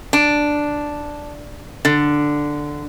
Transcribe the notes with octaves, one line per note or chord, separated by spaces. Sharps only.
D4
D3